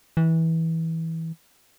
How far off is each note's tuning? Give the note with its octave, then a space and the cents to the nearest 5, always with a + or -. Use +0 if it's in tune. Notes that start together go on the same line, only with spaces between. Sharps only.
E3 -20